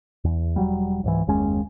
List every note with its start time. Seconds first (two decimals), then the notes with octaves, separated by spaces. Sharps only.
0.24 E2
0.56 E1 F#3 G3
1.04 C#2 G#2 E3
1.27 F#1 D#2 G#3 C#4